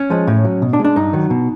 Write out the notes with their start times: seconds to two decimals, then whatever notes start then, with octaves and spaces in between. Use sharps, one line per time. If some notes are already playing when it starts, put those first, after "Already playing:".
Already playing: C#4
0.10 F3 G#3
0.27 A2
0.45 F#3
0.62 B2
0.73 D4
0.79 G#3
0.85 D4
0.96 G2 D#4
1.13 D#3 F#3
1.30 B2